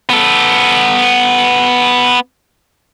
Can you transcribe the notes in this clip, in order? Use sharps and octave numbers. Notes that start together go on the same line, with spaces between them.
B3 A4